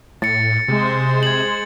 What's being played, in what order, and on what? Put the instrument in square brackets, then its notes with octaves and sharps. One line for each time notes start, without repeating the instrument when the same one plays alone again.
[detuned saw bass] A2 [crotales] A6 C#7
[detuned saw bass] C3 [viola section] G#3 C5
[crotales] G#6 F#7